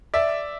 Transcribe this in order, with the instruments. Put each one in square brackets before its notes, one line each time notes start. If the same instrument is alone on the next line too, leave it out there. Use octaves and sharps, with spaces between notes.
[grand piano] D5 E5